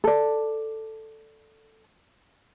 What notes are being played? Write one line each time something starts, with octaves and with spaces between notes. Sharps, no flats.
A4 D5